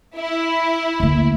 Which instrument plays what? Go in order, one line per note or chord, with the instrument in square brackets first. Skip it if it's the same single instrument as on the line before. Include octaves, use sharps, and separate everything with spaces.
[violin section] E4
[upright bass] D2 A#3